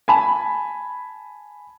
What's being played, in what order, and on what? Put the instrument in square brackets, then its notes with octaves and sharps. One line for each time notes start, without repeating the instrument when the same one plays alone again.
[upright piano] G#5 A5 B5